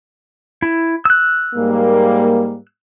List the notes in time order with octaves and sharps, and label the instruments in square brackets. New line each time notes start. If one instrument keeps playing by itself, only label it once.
[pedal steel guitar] E4
E6 F#6
[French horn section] G#2 G3 A#3